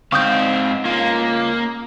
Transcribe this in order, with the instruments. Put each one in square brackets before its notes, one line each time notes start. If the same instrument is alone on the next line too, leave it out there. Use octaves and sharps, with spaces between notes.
[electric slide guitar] G#2 F5 [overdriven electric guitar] C4 [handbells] C#6 D#6 G6
[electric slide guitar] A#3 [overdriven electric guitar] C#4 F4